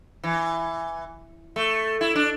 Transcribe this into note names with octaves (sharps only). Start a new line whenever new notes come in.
E3
A3
E4
D4